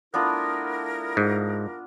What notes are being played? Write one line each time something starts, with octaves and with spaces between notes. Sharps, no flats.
A3 B3 D4 E4 F4 A#4
G#2